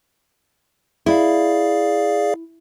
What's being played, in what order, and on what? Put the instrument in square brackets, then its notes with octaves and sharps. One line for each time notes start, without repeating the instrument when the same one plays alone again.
[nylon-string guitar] E4 [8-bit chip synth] G#4 D5 F5